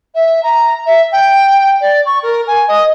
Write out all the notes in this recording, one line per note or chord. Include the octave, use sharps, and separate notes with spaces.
E5
A#5
E5
G5
D5
C#6
A#4
G#5
D#5